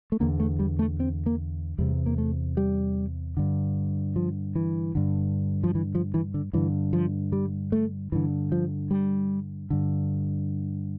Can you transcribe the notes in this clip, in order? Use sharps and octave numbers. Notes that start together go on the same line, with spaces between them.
A3
E2 D3 A#3
A3
G3
A3
C4
A#3
E2 C3 G3
A#3
A3
G3
G2 D3
F3
E3
G2 D3
F3
E3
F3
E3
D3
G2 D3 E3
F3
G3
A3
G2 D3 E3
F3
G3
G2 D3